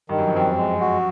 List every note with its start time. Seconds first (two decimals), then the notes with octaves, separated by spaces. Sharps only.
0.09 G2 D#3
0.18 F#2
0.27 F2
0.33 F#2 C4
0.57 G#3
0.81 F#4